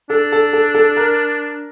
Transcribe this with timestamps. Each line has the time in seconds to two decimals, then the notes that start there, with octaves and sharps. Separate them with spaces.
0.10 D4 A4
0.32 A4
0.53 A4
0.74 A4
0.97 A#4